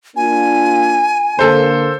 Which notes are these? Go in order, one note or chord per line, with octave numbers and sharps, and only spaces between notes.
A#3 D4 F4 G#5
D3 A#3 A4 C5